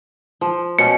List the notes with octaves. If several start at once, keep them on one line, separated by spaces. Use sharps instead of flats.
F3
B2 C#4 C#7